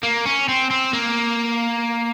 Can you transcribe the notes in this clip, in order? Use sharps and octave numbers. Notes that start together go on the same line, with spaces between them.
A#3
C#4
C4
C4
A#3